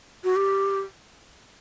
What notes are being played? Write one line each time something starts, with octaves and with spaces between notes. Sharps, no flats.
F#4
G4